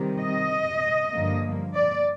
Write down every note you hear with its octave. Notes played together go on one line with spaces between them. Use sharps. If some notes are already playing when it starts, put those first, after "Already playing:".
Already playing: C3 D#3 G3
D#5
G2 D3 F3 A#3
D5